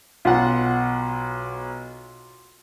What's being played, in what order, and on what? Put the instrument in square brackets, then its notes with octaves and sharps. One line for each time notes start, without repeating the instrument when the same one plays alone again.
[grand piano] B1 [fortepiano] F4 F#5